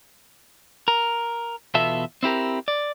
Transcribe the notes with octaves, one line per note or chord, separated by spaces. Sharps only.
A#4
E2 B2 B3 F4 A4 E5
C4 E4 G4 A#4
D5